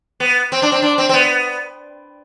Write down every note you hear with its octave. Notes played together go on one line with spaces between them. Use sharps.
B3
C4
D4
C4
D4
C4
C4
B3